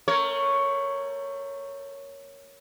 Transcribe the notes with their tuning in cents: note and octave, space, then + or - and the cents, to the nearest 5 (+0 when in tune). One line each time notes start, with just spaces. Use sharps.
A3 +35 A#4 +0 C#5 +0